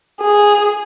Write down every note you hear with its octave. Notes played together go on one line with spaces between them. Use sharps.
G#4